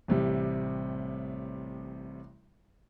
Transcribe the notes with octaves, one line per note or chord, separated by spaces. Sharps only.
A1 C3 G3